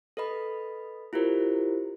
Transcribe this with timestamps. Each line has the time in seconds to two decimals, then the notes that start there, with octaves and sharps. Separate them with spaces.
0.17 A4 B4 D#5 B5
1.13 E4 F4 G4 A#4 C5